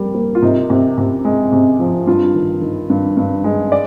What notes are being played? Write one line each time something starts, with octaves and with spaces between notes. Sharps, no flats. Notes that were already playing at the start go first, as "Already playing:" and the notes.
Already playing: G3 A#3
A#3
F4
C3 D#4
C3
C3
G#3
C3
F3
G2 F4
D#3
D#3
G2
G2
G#3
D5